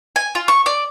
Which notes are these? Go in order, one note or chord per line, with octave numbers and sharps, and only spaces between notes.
G#5
F4
C#6
D5